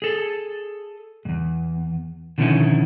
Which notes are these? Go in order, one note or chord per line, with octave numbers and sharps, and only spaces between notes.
G#4 A4
E2 G2
B2 D3 D#3 F3 C#4 E4